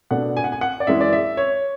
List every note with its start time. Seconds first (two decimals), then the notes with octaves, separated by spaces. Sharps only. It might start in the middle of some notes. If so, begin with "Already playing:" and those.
0.11 B2 A3 D4 F#5
0.37 G#5
0.44 F#5
0.52 G#5
0.61 F#5
0.80 D5
0.87 F#2 E3 G#3 E5
1.01 D5
1.13 E5
1.37 C#5